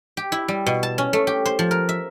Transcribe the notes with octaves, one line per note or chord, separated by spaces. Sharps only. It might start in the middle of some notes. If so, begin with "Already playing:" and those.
G4
E4
G3
B2
A5
C#4
A3
G4
C5
F3
A#4
E5